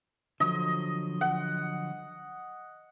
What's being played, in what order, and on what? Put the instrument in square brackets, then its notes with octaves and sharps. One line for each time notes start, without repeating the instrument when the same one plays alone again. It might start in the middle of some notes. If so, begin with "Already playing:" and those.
[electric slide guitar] D3 F3 F#3 [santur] D#5
[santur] F#5